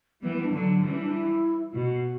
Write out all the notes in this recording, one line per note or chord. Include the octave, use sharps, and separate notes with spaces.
E3 G3 B3
B3
D4
D3 F#3 D4
E3 G3 C#4
D4
E4
E4
B2 F#4